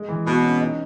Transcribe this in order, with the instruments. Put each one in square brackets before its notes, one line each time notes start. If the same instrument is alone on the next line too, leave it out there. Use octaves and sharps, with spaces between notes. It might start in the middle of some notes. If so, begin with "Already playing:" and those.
Already playing: [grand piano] G#3
E3
[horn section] B2 [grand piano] E4
[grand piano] C#4
D#4